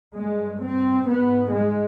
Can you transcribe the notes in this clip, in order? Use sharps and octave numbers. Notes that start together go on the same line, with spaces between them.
G2 G#3
C4
G#2 B3
G#3